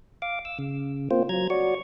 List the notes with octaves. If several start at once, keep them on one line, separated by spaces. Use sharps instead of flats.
F5 D6
E6
C#3
A#3 C4 F4 C5
F#3 A#5 G#6
F#4 C#5 D5 C#6